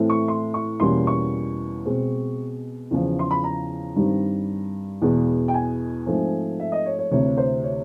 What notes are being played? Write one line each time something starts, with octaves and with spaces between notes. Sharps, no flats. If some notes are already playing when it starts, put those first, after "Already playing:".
Already playing: A2 E3 A3 C4
C#6
C6
C#6
E2 B2 G3 A#3 C#4 C6
C#6
B2 G#3 C4
E2 C#3 F3
C6
B5
A#5
G2 D#3 G3 C4
E2 B2 G#3 B3
G5
G#5
G#2 F3 A3 C4
E5
D#5
C#5
C#5
D2 C3 E3 C#5
C5
C#5